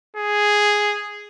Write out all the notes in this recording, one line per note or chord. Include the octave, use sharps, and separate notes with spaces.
G#4